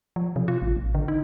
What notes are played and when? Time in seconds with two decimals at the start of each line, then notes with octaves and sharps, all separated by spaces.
0.16 F3
0.36 C3
0.48 F4
0.62 A1
0.76 A1
0.95 D3
1.08 D#4